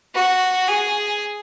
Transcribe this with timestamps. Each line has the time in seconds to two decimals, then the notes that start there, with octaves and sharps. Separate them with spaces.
0.14 F#4
0.67 G#4